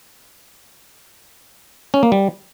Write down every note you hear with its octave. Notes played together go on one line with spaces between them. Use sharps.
C#4
A#3
G3